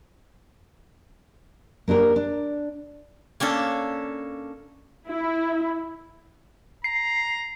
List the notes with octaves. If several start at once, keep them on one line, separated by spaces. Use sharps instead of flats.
A#3 D4 G4 A#4
D4
A#3 C#4 D4 A4
E4
A#5 C7